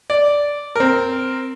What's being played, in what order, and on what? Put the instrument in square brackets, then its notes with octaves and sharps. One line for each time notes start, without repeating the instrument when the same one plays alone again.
[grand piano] D5
C4 A#4